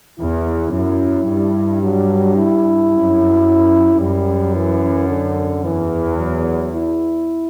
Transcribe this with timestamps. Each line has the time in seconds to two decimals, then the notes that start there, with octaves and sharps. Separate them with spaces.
0.19 E2 E4
0.73 F#2 E4
1.29 G2
1.82 F#3
2.37 E4
2.91 F#2
4.00 F#2 G3
4.55 E3
5.09 D3
5.64 E2 E3
6.18 F#3
6.72 E4